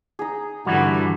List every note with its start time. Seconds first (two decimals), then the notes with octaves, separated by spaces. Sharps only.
0.19 D#4 G#4
0.66 G2 D3 E3 G3 F#4